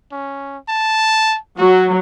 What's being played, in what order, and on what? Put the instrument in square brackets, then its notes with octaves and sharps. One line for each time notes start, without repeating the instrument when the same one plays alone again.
[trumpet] C#4
A5
[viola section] F#3 [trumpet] F#4